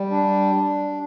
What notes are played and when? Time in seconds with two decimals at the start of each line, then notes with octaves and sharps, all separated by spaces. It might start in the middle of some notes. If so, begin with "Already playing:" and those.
Already playing: G3
0.11 D4